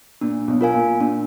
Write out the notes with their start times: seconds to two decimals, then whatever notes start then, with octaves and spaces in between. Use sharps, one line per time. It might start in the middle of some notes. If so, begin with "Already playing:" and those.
0.21 A#2 D4
0.48 B1 B2
0.61 F4 A#4 F5 G#5
0.75 A#2
1.00 A#2 D4